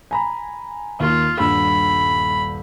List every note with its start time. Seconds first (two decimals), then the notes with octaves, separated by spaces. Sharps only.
0.11 G#5 A#5 B5
1.00 D#2 A#3 F4
1.40 D#1 G2 B5 E6